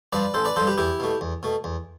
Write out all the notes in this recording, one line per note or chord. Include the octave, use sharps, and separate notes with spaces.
G2 F3 B4 D5
A1 A4 C5
B4 D5
G2 F3 A4 C5
G4 B4
E2 E4 G4
B2 A3
E2
B2 A3
E2